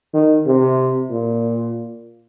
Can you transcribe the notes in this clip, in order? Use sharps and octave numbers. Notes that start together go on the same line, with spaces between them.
D#3
C3
A#2